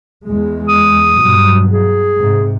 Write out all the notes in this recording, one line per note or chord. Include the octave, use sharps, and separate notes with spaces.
E2 G#3
D#6
G2 B2 F#3
G#4
G#2 C3